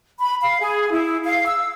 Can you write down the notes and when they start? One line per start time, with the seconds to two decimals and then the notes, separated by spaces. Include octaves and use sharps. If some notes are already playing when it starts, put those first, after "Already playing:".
0.20 B5
0.41 F5
0.61 G#4
0.91 E4
1.25 F5
1.46 E6